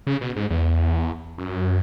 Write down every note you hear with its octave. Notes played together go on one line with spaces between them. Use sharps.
C#3
B2
G#2
E2
F#2